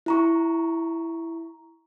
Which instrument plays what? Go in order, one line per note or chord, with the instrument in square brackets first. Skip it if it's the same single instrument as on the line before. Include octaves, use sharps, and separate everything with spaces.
[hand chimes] E4 A#5 C#6